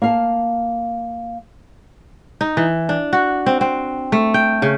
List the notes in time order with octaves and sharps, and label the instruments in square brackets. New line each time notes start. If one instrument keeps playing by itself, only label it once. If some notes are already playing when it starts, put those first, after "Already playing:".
[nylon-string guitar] A#3 F5 A5
[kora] D#4
E3
D4
F#4
C4
C4
A3
G5
C#3